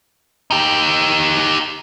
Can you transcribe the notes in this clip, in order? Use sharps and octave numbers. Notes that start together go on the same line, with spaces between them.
D#4 G4